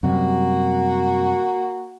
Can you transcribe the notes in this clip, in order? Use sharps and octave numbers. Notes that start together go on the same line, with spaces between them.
F#2 C3 G3 A#3 F#4